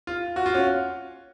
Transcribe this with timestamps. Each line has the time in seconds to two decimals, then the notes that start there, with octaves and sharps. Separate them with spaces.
0.07 F4
0.36 F#4
0.46 F4
0.54 C#4